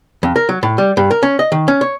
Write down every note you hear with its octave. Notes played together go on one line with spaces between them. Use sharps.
F2
A#4
F#3
A2
G3
G2
A#4
C#4
D#5
D#3
C#4
C#5